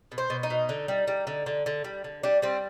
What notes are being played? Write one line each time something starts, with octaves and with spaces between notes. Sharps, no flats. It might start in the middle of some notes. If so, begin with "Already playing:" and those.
B2
C5
B2
D#4
B2
D3
G3
G3
D3
D3
D3
G3
D3
G3 D4
G3 C4